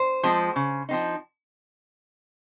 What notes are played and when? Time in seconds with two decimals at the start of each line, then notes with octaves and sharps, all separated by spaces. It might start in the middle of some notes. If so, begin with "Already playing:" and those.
Already playing: C5
0.23 F3 G#3 C4
0.56 C#3
0.89 F3 C4 D#4